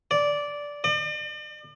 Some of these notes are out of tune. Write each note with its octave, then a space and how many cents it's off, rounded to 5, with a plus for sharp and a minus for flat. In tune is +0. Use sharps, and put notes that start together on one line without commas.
D5 -10
D5 +45